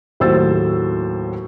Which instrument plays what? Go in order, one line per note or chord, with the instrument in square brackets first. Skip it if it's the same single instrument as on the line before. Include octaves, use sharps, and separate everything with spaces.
[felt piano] D#2 A2 F#3 C5 E6 A6